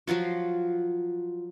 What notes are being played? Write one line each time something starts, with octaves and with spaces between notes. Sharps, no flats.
F3 F#3 F4 F#4